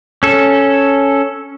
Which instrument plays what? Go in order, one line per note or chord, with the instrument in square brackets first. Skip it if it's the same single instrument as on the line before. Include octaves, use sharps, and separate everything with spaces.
[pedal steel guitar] C#4 A4